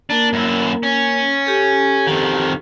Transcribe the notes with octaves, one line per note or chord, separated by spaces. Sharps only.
A#3 D4 A#4
F#2 E4
C#4
G4 A4
F2 D#3